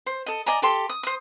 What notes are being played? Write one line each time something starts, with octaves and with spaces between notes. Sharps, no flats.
C5
A4 D#5
D5 D#5 G#5 A#5
G4 A4 C6
D#6
C5 D#6